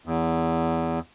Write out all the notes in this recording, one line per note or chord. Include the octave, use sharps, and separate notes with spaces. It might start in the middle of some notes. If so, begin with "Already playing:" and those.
E2